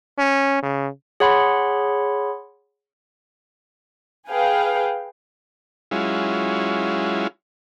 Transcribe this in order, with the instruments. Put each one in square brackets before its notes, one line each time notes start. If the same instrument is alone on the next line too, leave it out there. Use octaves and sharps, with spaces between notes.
[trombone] C#4
C#3
[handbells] G#4 C#5 F#5 B5 C6
[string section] G#4 B4 F5 G5
[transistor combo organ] F#3 G#3 C#4 E4 F4